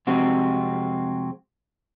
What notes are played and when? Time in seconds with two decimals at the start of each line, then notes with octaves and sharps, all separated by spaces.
0.07 F2 C3 G#3 C4 F#4